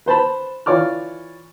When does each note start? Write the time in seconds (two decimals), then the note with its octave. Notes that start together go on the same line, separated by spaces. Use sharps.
0.06 B4 C5 A5 B5
0.66 E3 F4 C#5 D5 D6 F6